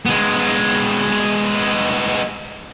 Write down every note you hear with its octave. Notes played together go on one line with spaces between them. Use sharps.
G#3 B3